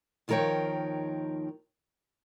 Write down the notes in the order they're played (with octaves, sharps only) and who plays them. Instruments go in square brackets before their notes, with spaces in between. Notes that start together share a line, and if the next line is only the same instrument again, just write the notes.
[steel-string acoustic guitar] D#2 D#3 F3 A#4 C#5 G5